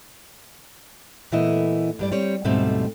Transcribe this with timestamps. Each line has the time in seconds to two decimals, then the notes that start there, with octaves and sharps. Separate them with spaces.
1.32 A#2 E3 A3 B3 E4 D#5
1.99 G2 G3 D5
2.12 G3 C4 C#5
2.44 D2 G#2 B2 G3 A3 C4